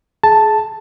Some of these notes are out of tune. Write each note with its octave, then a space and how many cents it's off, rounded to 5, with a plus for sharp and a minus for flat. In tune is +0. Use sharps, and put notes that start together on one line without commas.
G#4 +25 A5 +0